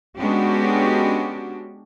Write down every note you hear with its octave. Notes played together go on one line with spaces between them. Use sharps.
G#3 B3 C#4 D4 F#4 G4